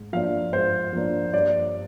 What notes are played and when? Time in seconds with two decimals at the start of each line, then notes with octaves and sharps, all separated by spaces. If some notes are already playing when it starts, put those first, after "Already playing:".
Already playing: G#2
0.13 F3 A#3 D4 F5
0.53 G#2 C5
0.93 F3 A#3 D4
1.33 G2 D5